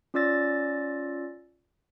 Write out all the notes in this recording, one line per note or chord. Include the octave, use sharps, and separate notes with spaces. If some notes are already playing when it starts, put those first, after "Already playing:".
C#4 F4 D5 E6 A6 A#6